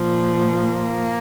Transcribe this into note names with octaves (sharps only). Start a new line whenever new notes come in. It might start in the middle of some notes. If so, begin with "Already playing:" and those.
Already playing: A#2 F3
A#3